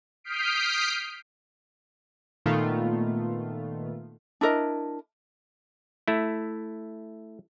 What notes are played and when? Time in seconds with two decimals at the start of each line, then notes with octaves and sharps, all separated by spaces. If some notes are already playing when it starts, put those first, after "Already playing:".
0.24 D#6 F6 G6 B6 C7 D7
2.46 A#2 D#3 A3 B3 F4
4.41 D4 E4 A#4 D#5
6.08 A3 E4